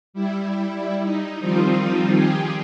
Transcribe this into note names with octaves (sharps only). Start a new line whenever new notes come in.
G3 E4
D#4
D#3 F3 G3 C4 D#4 F4
G4 G#4